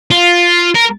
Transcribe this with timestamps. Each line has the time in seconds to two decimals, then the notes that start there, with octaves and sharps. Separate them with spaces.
0.11 F4
0.75 A#4